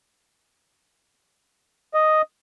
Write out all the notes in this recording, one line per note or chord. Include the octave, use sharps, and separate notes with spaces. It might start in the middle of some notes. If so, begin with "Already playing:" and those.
D#5